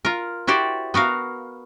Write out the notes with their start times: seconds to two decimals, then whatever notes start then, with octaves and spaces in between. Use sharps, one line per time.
0.05 F4 A#4
0.47 E4 F#4 G4 C5 D5
0.94 B3 F#4 A#4 F5